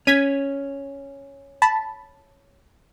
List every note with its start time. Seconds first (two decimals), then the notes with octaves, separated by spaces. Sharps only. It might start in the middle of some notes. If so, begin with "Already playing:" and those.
0.07 C#4 G#6 B6 D#7
1.62 A5 B5